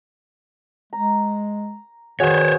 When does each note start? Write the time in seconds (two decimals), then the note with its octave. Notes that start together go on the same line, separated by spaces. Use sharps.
0.93 G#3 A#5
2.20 D#3 F#4 G#4 C5 C#5 F5